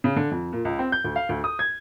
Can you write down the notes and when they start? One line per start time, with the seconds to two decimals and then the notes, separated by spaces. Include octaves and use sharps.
0.04 C#3
0.16 D3
0.31 F2
0.53 A#2
0.65 C#2
0.79 C4
0.92 G6
1.04 D2
1.16 F5
1.29 D2
1.44 D#6
1.59 G#6